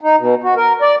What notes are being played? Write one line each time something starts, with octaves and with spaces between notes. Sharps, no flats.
D#4
B2
F#4
A#4
D5